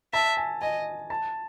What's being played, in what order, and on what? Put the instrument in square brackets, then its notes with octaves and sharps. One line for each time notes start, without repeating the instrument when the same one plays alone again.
[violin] E5 [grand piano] A5
[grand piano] G#5
[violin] D#5 [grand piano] G#5
[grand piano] A5